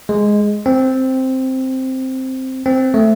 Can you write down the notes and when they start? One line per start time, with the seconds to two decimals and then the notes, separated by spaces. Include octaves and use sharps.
0.09 G#3
0.66 C4
2.66 C4
2.94 A3